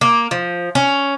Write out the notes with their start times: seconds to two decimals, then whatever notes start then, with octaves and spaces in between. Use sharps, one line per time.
0.01 A#3
0.31 F3
0.75 C#4